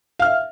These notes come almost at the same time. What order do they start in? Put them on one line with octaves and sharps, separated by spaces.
F5 F6 E5